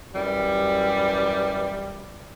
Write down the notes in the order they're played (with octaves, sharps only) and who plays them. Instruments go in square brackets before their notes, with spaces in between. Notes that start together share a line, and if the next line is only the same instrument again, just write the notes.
[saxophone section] F#2 E3 G3